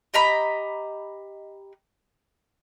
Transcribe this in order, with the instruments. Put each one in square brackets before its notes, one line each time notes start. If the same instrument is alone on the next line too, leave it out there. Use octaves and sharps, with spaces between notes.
[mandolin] G4 D#5 A#5 B5